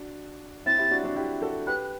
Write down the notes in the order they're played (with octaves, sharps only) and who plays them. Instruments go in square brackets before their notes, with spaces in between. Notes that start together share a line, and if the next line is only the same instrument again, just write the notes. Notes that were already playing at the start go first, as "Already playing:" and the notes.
Already playing: [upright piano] D4 F#4
[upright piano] C4 E4 [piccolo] A6
[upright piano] E4 G4
D4 F#4
D4 F#4
E4 G4
F#4 A4
[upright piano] G4 B4 [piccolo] F#6